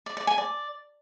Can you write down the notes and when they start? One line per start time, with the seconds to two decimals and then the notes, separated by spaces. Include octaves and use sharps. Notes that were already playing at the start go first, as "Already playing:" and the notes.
0.06 D5
0.17 D5
0.27 G#5
0.38 D5